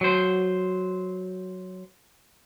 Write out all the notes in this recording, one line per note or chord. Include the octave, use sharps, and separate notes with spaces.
F#3 C5